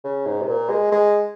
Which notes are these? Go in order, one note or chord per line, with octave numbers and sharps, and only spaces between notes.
C#3
G#2
C3
A#2
G#3
G#3